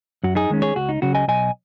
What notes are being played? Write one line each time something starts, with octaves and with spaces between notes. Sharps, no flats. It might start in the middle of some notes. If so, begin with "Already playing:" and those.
F#2 F#4
D#4 G#4
D#3 G#3 C#4
G#4 C#5
C#2 F#4
D#4
C#3 F#3 F#4
D#5 G#5
B1 D#5 G#5